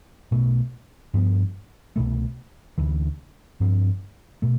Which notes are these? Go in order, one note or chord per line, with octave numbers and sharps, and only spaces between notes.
B1 B2 A3
G2 F3 B3
C2 B2 A3
D2 C3 E3
G2 F3 C4
B2 A3